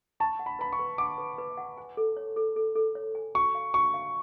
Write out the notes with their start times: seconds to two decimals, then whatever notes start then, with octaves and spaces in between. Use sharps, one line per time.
0.20 A5 C#6
0.39 F#5
0.46 B5
0.59 B4 B5
0.73 C#6
0.79 B4
0.98 F#5 D6
1.18 B4
1.38 B4
1.57 F#5
1.77 G#5
1.97 A4
2.17 C#5
2.37 A4
2.56 A4
2.75 A4
2.95 C#5
3.15 G#5
3.35 F#4 C#6
3.55 F5
3.74 F#4 C#6
3.94 F5